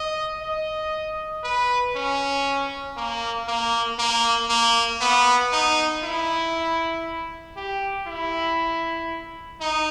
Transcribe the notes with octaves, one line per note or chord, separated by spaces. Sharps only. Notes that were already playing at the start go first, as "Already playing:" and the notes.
Already playing: D#5
D#5
B4
C#4
A#3
A#3
A#3
A#3
B3
D#4
E4
G4
E4
D#4